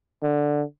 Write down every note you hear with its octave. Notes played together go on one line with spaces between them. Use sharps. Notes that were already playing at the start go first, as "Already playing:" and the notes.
D3